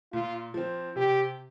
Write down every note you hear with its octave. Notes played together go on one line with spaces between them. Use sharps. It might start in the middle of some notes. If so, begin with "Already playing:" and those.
A#2 F4
F3 C4
C3 G4